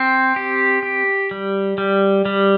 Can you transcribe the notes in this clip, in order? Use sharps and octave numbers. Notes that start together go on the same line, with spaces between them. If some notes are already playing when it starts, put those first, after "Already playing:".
Already playing: C4
G4
G4
G3
G3
G3